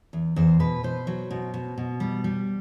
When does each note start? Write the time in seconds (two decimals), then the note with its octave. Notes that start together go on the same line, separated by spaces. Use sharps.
0.13 E2
0.36 E2 C5
0.59 B2 B4
0.83 B2 C5
1.07 F#3
1.31 B2
1.54 B2
1.78 B2
2.00 G3
2.24 G3